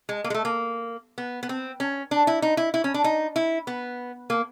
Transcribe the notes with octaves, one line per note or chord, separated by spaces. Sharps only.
G#3
A#3
G#3
A3
A#3
B3
B3
C4
C#4
D4
E4
D#4
E4
E4
C#4
D4
D#4
E4
B3
A#3